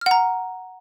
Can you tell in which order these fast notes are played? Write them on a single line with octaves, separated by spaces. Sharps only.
F6 F#5 A#5